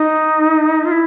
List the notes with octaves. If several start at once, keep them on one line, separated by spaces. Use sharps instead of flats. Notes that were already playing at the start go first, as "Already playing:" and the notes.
Already playing: D#4
F4
E4